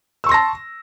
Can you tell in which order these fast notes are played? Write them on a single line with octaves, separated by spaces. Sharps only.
E6 C#6 C6 A#6 A5